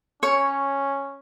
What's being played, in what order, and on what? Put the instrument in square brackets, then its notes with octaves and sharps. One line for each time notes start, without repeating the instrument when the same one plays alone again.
[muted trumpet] C#4 [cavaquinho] C#5 C#6